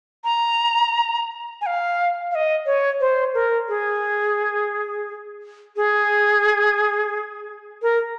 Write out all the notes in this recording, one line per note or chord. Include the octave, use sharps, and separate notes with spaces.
A#5
G#5
F5
F5
D#5
C#5
C5
A#4
G#4
G#4
A#4